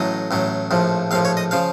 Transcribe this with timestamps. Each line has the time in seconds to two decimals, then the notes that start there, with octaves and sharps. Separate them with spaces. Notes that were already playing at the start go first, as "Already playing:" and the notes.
Already playing: A1 A2 F#3 D#5
0.31 A1 A2 F#3
0.71 A#1 A2 F3
1.11 A#1 A2 F3 F5
1.25 C#5
1.37 D#5
1.51 C#3 F3 F5